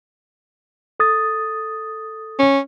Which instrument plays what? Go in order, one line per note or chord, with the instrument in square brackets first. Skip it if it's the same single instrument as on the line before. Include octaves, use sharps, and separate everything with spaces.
[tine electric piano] A4 D#6 A6
[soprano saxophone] C#4